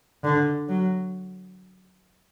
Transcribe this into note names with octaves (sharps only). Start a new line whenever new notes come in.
D3
F#3